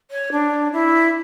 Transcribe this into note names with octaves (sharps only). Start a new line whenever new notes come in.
C#5
D4
E4